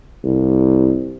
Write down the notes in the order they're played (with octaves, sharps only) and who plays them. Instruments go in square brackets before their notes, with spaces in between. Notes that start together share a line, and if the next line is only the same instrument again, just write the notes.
[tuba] C2